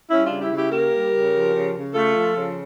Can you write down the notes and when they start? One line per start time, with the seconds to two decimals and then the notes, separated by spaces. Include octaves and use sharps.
0.10 G3 C#4 E4
0.25 C#3 D4 F4
0.41 E4 G4
0.50 C#3
0.56 E4 G4
0.71 A#3 G4 A#4
0.92 G3
1.13 C#3
1.33 F3
1.53 C#3
1.74 C#3
1.94 A3 F4 A4
2.14 F3
2.35 C#3